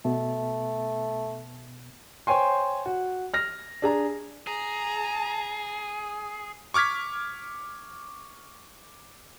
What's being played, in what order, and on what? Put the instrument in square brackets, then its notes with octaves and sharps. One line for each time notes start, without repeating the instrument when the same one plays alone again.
[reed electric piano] B2 B3 [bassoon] A3
[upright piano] C5 C#5 G5 G#5 C6
F#4
F6 A#6
D4 G#4 A#5
[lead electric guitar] G#4 [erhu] A#5
[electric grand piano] C#6 D6 F6 G#6 B6